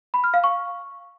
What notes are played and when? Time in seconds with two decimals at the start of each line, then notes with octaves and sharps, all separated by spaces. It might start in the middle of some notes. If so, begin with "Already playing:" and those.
0.14 B5
0.24 F6
0.34 F5
0.44 C#6